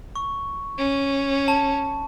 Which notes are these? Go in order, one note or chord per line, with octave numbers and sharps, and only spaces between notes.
C#6
C#4
A5